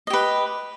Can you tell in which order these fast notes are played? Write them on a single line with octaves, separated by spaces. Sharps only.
D#5 G4 B4